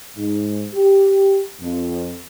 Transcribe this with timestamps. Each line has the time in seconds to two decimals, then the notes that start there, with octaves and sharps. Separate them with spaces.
0.17 G#2
0.74 G4
1.61 F2